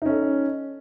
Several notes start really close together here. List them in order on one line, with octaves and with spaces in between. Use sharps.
D#4 C#4 A4